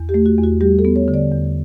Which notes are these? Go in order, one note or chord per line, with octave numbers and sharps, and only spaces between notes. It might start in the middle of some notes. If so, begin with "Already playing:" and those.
Already playing: E2
G4
A3
F#4
E2
F#4
G3 G4
A4
B3
C#5
D3
D5
E2